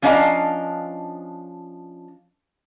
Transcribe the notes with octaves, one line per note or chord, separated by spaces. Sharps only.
F3 C#4 D4 D#5 F5 A#5